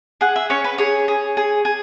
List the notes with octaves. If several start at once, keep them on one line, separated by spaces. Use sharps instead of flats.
G#4 F#5
E5
C#4 C#5
B4
G#4 C#5
G#4
G#4
G#4